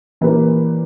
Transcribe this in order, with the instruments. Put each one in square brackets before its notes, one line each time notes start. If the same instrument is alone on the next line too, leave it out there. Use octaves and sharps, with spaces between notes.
[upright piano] A#2 A#3 C#4 G4 B4 [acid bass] E3